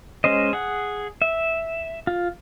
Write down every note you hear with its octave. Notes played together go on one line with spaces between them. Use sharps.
G#3 C#4 C5 D#5
G#4 F#5
E5
F4